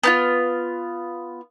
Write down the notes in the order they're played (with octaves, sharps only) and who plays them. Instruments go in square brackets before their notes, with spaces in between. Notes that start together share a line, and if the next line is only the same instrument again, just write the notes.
[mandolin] B3 D#4 F4